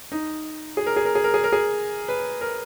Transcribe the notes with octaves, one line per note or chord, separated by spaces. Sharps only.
D#4
G#4
A#4
G#4
A#4
G#4
A#4
G#4
A#4
G#4
B4
A#4